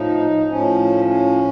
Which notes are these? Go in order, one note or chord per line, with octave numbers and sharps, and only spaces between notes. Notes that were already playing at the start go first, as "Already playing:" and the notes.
Already playing: A2 F3 D#4
A2 F3 C#4
C#4